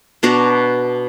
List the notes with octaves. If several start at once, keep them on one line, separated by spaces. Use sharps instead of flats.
B2 D4 F#4 A#5